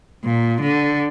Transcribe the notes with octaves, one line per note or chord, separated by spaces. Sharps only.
A#2
D3